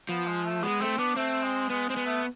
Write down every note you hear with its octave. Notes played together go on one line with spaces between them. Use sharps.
F3 B3
G#3
A3
G#3 B3
A3 C4
B3 D4
A3 C4
G#3
G#3 B3
G#3 C4
B3
A3